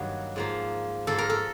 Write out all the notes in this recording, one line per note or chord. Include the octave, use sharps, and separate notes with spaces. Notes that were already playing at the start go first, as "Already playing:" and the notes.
Already playing: G2 D#3 F#3 A#3
G#2 F3 A#3
G#2 F3 A#3 A4
A#4
A4